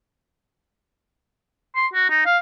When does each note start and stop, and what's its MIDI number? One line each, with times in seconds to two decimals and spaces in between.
1.76 1.87 84
1.93 2.08 66
2.10 2.24 63
2.26 2.38 77